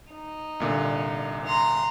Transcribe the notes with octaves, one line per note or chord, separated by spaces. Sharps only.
D#4
C2 A#2 D3
A#5 C6